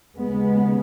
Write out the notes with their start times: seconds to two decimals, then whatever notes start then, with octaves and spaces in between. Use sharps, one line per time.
0.17 D#2 C#3 G#3 B3